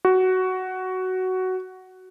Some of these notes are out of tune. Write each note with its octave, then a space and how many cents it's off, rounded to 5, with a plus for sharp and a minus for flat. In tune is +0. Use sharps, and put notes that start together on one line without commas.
F#4 +10